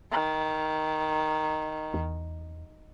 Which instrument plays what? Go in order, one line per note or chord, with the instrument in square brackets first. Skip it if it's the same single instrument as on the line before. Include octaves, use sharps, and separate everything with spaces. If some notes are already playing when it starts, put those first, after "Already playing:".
[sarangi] D#3
[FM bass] E2